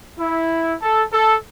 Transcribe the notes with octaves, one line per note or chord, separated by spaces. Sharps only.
E4
A4
A4